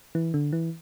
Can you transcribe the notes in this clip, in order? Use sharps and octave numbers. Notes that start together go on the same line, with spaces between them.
E3
D3
E3